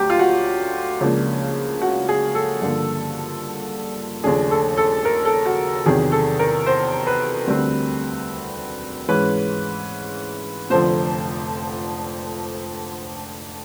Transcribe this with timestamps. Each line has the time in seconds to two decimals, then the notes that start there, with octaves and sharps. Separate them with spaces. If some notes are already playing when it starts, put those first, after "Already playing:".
Already playing: D2 D3 F#3 G4
0.10 F4
0.19 F#4
1.01 C#2 C#3 F3 A#3 D4
1.82 F#4
2.09 G#4
2.35 A4
2.62 G2 D3 F3 A#3
4.24 D#2 C#3 F3 A3 D4 G#4
4.51 A4
4.77 A4
5.05 A#4
5.25 A4
5.46 F#4
5.85 E2 C3 D#3 F#3 G#4
6.12 A4
6.39 A#4
6.67 C5
7.07 B4
7.47 D2 D3 G3 C4
9.08 G#2 E3 G#3 C#4 B4
10.70 F1 F2 D3 F3 C5